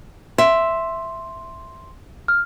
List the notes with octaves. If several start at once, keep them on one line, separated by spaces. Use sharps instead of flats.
E5 C6
F6